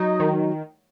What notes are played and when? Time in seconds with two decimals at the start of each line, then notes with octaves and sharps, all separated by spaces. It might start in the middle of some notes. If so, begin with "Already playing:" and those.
Already playing: F#3 D#4
0.20 D#3